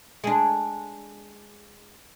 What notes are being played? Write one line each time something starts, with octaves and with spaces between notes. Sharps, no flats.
G#3 D4